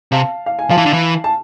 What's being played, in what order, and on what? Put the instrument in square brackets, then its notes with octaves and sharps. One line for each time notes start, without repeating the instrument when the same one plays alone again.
[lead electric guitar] C3 [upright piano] F5 A5
[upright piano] F5
G#5
[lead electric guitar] F3 [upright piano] F5 A5
[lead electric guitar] E3
D3
E3
[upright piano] A5